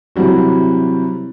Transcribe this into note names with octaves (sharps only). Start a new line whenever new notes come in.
C3 E3 F#3 G3 F#4